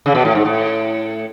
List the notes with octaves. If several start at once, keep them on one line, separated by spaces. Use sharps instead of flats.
C#3
B2
A2
G#2
A2